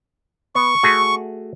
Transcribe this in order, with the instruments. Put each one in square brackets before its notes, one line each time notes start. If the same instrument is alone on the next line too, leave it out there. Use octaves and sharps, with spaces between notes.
[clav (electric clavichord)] B3 [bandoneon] C#6
[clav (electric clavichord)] A3 F#4 G#4